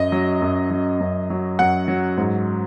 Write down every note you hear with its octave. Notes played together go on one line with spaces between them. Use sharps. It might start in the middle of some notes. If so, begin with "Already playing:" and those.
Already playing: F#2 D#5
F#3
F#2
F#3
F#2
F#3
F#2 F#5
F#3
G#2